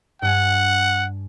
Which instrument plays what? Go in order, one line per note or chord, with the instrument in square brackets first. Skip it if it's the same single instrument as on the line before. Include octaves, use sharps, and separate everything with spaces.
[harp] G2 D4 G#5 [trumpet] F#5